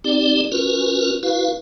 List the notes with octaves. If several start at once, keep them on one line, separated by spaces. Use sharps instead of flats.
C4 D#4 G4 D5
C#4 F4 F#4 A#4 B4
E4 F#4 B4 F5